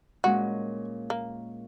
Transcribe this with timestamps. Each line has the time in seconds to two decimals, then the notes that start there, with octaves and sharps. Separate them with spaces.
0.24 A#2 G#3 C#4 F#4
1.10 A#3